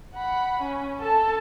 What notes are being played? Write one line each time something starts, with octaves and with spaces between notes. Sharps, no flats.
F#5 B5
C#4
A4 A5